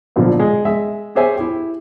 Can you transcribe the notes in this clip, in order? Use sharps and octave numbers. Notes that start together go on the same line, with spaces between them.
B1 A#2 D3 F3
G#3
G#3 E5
G4 G#4 C5 C#5 E5 G#5
E4 G4